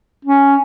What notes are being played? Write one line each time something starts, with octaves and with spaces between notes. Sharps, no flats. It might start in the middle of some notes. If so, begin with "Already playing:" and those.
C#4